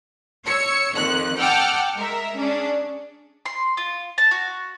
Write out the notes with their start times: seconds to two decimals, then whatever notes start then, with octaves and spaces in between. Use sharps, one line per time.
0.46 C#5 E6 C#7
0.95 F2 D#3 F#6
1.38 F#5 G5 A5 D6 E6 F6
1.95 G#3 A#4 E5
2.37 C#4 D4 G#4
3.46 C6
3.77 F4
4.18 A5
4.31 F#4